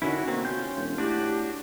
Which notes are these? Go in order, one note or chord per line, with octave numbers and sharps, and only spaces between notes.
D3 D#3 C#4 E4 F#4
B2 A#3 C4
C#4 F4 C6 G6
E1
A2 D4 F#4 G4